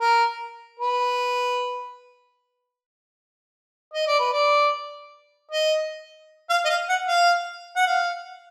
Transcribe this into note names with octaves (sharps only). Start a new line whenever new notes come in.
A#4
B4
D#5
D5
B4
D5
D#5
F5
D#5
F5
F#5
F5
F#5
F5